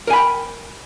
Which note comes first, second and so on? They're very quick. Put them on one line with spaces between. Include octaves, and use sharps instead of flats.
A#4 G#5 B5 G5